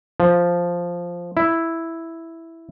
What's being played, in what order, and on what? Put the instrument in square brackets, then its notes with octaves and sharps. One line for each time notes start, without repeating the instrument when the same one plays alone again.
[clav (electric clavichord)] F3
E4